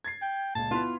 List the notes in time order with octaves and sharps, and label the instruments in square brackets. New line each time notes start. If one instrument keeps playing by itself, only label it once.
[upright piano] G#6 A6 C7
[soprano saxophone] G5
[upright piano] C#2 A#2 [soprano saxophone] A5
[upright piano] B3 E4 B4 [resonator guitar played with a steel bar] F4